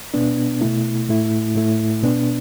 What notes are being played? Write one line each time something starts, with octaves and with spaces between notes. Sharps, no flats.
B2 B3 D4
B2 A3 E4
A2 A3 E4
A2 A3 E4
B2 B3 D4